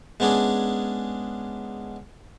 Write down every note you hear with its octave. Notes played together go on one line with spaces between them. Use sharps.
G#3 B3 C#4 D4 G#4